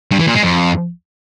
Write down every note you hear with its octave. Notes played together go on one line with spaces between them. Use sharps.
G2
E3
A#2
G#3
F2